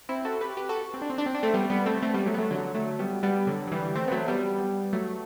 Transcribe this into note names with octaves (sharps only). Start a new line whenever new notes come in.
C4 E4
F#4 A4
G4 B4
G4 B4
F#4 A4
C4
D4
C4
D4
C4
D4
A3 C4
G3 B3
G3 B3
A3 C4
A3 C4
G3 B3
F#3 A3
B3
F#3 A3
D3 F#3
F#3 A3
G3 B3
G3 B3
D3 F#3
F#3
E3 G3
A3 C4
B3
F#3 A3
G3 B3
F#3 A3